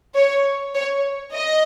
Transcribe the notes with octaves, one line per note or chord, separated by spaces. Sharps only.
C#5
C#5
D#5